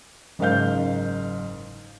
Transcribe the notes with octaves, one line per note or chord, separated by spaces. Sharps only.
F#1 G#2 A#4 F5 G6